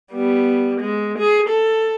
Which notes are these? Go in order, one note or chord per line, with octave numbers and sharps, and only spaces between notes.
G3 B3
G#3
G#4
A4